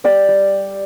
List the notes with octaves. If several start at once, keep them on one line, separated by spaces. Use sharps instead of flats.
G3 D5 G5
G3